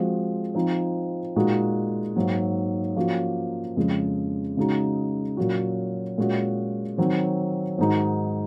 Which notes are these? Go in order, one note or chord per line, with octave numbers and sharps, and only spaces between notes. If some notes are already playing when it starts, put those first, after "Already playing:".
Already playing: F3 G#3 C4 F#4
F3 C4 D#4
A#2 G#3 D#4 F#4
G#2 F#3 A#3
F3 A#3 C#4 F#4
F2 C#3 G#3
C#3 G#3 D#4 F#4
A#2 F#3 C#4 F#4
A#2 G#3 C#4 F#4
D#3 F#3 C4
G#2 D#3 G#3 D#4 F#4